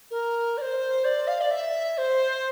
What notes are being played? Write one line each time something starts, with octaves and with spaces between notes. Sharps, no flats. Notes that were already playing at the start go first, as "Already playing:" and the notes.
A#4
D5
C5
D5
F5
D5
E5
C5